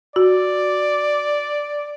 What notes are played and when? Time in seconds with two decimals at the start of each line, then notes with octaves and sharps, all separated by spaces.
0.16 F#4 D5